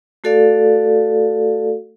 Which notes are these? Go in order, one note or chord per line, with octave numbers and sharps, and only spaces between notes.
A3 F#4 A4 D5 F5